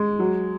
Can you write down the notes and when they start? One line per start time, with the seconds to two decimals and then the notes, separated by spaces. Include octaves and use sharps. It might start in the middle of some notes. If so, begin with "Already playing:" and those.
Already playing: G#3
0.19 F#3